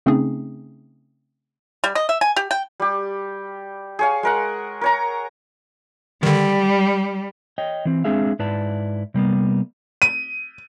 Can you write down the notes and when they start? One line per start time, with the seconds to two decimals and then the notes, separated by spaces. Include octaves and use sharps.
0.06 C#3 A3 C4 C#4 D#4 G#4
1.84 G3
1.95 D#5
2.09 E5
2.21 G#5
2.36 G4
2.51 G5
2.80 G3 G4
3.99 G#4 C#5 F5
4.23 G#3 A#4 F#5
4.81 A#4 C#5 A#5
6.23 D3 D#3 G3
7.58 C#5 D#5 G5
7.85 E3 C4
8.04 G#3 C4 D4 G#4 E5 F5
8.39 G#2 E4 B4 D5 A5
9.14 C3 G3 A#3 B3
10.02 D#7